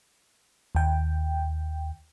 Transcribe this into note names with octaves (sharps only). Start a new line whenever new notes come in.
D#2 G5